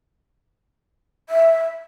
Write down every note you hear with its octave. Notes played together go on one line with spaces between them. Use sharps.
E5